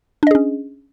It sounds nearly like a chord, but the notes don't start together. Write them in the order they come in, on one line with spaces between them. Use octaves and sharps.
D4 D#5 G#4 C#4